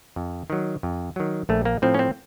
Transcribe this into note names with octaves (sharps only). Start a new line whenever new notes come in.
F2
D#3 F#3
F2
D#3 F#3
A#1 A3
A#3
A2 F3 C4
C#4
C4